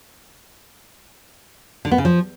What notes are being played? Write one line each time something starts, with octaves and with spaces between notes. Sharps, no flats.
D3
B3
C#3
F3